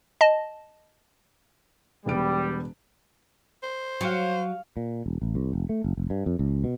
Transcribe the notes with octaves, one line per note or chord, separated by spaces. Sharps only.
D#5 A5
E1 G3 B3 D7
C5
F#3 F5 C#6
A#2
E1
A1
C2
F1
A3
F#1
F1
G2
F2
C#2
B2